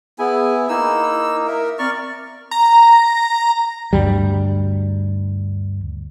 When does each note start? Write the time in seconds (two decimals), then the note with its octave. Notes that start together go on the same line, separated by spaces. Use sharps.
0.19 B3 E4 G#4 G#5
0.69 A#3 D#4 E4 E6
1.47 A#4 E5
1.79 C4 A#4 D5 C#6 F6
2.51 A#5
3.93 D2 G2 G3